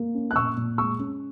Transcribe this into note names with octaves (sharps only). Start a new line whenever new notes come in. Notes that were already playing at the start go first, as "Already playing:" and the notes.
Already playing: A#3
C#4
F#6
A#2 C#6 E6
A#2
G#3 C#6 E6
C#4